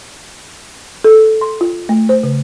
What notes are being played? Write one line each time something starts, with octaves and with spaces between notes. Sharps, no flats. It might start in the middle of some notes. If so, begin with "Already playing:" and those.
A4
C6
F4
A3
C5
C#3